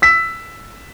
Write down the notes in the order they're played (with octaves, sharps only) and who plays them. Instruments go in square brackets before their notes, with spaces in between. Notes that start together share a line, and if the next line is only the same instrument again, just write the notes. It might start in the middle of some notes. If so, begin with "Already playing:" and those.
[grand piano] E6 B6